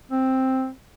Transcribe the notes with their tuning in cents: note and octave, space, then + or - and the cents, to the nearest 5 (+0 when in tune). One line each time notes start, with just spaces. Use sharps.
C4 +5